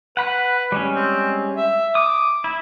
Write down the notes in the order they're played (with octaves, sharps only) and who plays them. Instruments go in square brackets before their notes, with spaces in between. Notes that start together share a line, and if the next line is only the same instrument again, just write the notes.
[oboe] B4 [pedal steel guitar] F#5 B5
[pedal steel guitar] G3 G#3 C#4
[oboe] C4
E5
[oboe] D6 [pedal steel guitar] D#6
[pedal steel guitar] E4